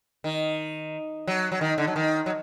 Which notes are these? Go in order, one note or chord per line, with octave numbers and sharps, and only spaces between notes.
D#3
F#3
F#3
D#3
D3
F#3
D#3
F#3